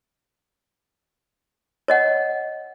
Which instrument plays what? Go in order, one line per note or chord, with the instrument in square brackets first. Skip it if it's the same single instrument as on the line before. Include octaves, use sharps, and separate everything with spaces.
[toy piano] C#5 D#5 F#5